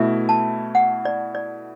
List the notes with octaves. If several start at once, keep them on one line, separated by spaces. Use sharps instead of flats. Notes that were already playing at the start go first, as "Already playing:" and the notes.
Already playing: B2 A3 E4 E5
A5
F#5
D5
D5